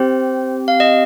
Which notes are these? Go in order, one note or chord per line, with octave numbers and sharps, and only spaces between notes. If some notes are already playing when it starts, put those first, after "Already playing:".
Already playing: C4 G4 C5
F5
D#5